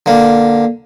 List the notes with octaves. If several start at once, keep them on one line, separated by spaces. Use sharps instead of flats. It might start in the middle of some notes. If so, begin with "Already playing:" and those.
D3 A#3